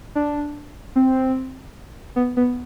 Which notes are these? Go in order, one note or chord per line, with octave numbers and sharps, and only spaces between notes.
D4
C4
B3
B3